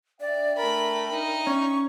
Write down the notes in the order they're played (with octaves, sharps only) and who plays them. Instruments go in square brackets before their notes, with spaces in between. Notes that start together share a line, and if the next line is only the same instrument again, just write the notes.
[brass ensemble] D4 E5 G5 [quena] D5
[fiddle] A3 B5 [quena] A#4
[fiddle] D#4
[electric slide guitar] C#4 [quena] C#6